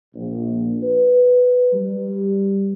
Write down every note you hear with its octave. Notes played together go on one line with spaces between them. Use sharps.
A#1
B4
G3